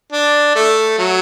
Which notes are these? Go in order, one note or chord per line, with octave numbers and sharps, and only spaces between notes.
D4
A3
F#3